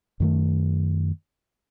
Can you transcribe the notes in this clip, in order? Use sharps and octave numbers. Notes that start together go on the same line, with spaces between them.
F#2 D#3 A3